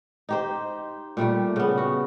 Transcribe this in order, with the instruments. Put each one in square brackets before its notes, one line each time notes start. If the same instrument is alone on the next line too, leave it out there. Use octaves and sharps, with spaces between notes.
[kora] D#4 G4 C5
A#2 G3 A3 G4
C#3 B3
F#4